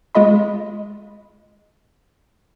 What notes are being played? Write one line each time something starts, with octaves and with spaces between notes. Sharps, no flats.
G#3 F4 D#5 B5